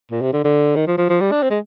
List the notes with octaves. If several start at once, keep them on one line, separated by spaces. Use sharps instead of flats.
A#2
C3
D3
D3
D#3
F3
F3
F3
G3
D4
C4
G#3